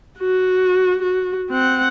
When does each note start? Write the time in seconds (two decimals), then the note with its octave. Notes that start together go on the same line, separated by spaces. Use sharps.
0.20 F#4
1.03 F#4
1.50 C4 F#5